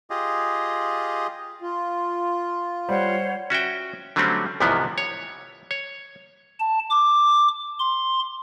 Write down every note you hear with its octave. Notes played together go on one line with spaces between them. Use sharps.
F4 G4 G#4 D#5
F4
G3 C5 C#5 F#5
C#4 F#4 E5 G5
D3 F#3 G3 A3 C4 C#4
C2 G#2 C3 E3 F3 B3
C#5
C#5
A5
D6
C6